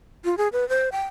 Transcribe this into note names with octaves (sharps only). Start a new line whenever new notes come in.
F4
G#4
B4
C5
G5